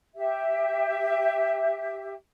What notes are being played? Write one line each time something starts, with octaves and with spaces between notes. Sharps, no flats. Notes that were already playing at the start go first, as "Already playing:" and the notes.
G4 E5